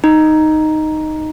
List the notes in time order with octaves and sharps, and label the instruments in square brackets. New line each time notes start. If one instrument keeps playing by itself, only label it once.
[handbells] D#4